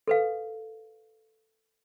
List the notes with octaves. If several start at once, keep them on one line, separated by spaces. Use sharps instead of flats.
A4 B4 F5